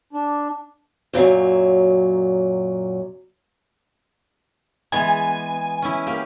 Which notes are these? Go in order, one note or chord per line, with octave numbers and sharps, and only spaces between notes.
D4
F#2 A#2 D#3 F#3
E3 G#3 B3 G#5
C#4 E4
A#3 G4